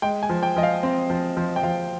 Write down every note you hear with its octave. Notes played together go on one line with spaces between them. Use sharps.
G#3 G5
G#5
F3
G5
F3 D#5
F5
C4
F3
F3
G5
F3 F5